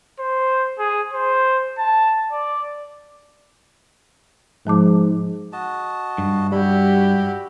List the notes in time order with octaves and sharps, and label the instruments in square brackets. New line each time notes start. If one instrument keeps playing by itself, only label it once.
[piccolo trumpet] C5
G#4
C5
A5
D5
[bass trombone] G#2 [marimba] F3 A5 D6
[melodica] F#4 D#5 A5
[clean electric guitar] G2
[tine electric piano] G3 [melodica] E4 B5 [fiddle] F#4 G4